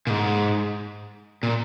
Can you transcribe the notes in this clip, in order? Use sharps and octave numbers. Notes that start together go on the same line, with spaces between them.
A#2
G#2
A#2